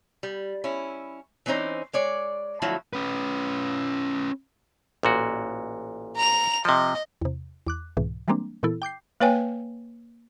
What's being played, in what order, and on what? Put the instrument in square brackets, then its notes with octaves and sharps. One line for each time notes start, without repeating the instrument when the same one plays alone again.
[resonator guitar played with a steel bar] G3
C#4 E4
E3 C4 C#4 D#4 C5 D5
G#3 C#5 D5
D3 F3 F#3 A3 E4 F#4
[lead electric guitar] C#4 B4
[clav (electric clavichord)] A1 A#2 F#4
[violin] A#5 F7
[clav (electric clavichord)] C3 F3 [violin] D#5
[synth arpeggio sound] E2 C3
E2 D6 F#6
C2 G#2 B2 E3
E3 G3 G#3 A#3 C4 D4
A#2 E3 B3 E4 A4
G5 D6 G6 C7
[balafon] A#3 B4 C#5 G5 G#5